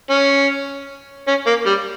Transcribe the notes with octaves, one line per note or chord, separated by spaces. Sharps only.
C#4
C#4
A#3
G3